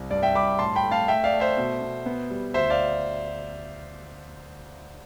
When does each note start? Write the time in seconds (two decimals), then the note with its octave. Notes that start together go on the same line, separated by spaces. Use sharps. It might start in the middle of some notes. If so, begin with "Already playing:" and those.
Already playing: C2
0.10 G2 D5
0.22 E5 G5
0.35 G2 B5 D6
0.59 A2 A5 C6
0.76 G5 B5
0.84 A3
0.91 F5 A5
1.08 A3 E5 G5
1.24 D5 F5
1.33 A3
1.40 C5 E5
1.57 B2
1.81 B2
2.06 B3
2.30 G3
2.54 D2 C5 E5
2.70 D5 F5